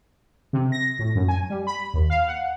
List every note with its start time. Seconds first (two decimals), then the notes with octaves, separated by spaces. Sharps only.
0.53 C3
0.72 A#6
0.99 A2
1.15 F#2
1.28 G#5
1.50 G3
1.67 B5
1.94 D#2
2.10 F5
2.27 F#5